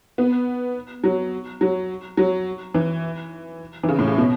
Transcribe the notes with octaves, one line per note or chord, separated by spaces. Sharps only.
B3
F#3
F#3
F#3
E3
E3
C#3
A2
C#3
B2